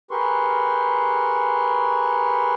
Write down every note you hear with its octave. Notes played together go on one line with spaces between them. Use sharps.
G4 G#4 A#4 B4 C6 C#6